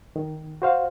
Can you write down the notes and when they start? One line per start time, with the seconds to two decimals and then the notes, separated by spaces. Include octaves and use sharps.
0.16 D#3
0.62 F#4 C5 F5